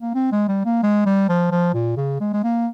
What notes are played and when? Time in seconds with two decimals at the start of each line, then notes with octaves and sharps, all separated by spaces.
0.02 A#3
0.15 C4
0.32 G#3
0.48 G3
0.65 A#3
0.83 G#3
1.06 G3
1.29 F3
1.51 F3
1.74 A#2
1.97 C#3
2.21 G#3
2.34 G#3
2.43 A#3